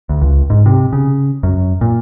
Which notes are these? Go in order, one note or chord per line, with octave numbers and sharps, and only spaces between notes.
D2
C#2
G#2
C3
C#3
F#2
A#2